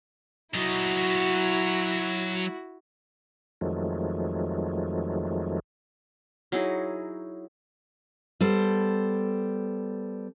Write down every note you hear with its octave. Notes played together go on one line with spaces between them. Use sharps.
F#3 E4 F#4 D#5
F2 D#3 F3 F#3 G#3 A3
F#3 D#4 E4 G#4
G3 B3 A4 C5